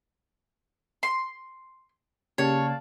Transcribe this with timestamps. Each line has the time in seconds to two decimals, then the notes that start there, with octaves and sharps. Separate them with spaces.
1.03 C6
2.38 C#3 A#3 G4 C#5 D5 F5 A5